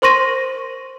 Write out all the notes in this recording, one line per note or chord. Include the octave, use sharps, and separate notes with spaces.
A#4 C5 C6 C#6 A#6 D#7